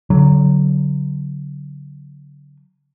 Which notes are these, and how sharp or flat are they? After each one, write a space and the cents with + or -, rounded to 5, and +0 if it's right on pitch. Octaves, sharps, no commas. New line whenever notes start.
D3 -35 F#3 +0